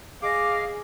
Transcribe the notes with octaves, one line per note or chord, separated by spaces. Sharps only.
G#4 D#5 F5 D6